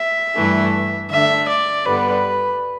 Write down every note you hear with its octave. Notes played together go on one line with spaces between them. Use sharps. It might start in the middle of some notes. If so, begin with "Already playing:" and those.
Already playing: E5
G2 E3 A3
D3 A3 D4 E5
D5
G2 D3 G3 B3 B4